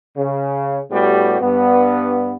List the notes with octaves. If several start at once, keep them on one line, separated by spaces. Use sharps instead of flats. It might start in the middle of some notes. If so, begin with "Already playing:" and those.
C#3
A2 G3 B3 F#4 G4
G2 B3